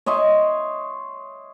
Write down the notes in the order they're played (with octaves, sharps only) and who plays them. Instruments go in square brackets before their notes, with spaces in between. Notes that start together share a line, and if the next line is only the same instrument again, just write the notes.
[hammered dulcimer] C#5 D#5 E5 C6